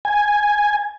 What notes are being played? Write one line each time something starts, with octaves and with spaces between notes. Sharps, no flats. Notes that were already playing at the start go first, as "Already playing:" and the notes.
G#5